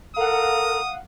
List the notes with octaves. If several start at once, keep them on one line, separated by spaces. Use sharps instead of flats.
A4 A#4 F5 F#5 A#5 D#6